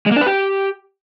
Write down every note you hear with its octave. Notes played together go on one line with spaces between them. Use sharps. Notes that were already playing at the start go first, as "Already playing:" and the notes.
G#3
A#3
D4
B4
G4